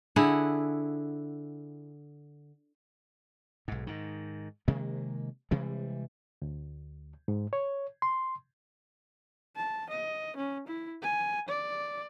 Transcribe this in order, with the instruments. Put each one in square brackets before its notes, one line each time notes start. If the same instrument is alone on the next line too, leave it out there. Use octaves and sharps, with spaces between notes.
[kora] D3 E4 G#4 F#5
[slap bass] B1 G#2
G#2 D#3
C3 D#3 G#3 A#3
C3 E3 G3 G#3
[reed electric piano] D2
G#2
C#5
C6
[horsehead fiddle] A5
D#5
C#4
E4
G#5
D5